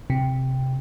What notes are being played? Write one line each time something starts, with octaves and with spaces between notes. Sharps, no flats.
C3